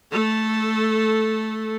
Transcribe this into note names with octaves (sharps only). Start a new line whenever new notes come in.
A3 A4